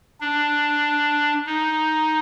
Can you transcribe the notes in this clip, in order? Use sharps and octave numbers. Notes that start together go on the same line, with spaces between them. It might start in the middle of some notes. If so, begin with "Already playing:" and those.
D4
D#4